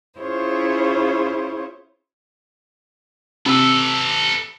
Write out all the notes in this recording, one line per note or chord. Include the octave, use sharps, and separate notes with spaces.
C#4 E4 F4 G#4 C5 C#5
C3 A4 B4 B5 E6